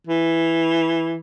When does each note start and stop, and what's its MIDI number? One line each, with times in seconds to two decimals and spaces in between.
0.07 1.16 52